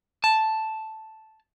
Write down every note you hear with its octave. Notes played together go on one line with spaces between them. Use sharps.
A5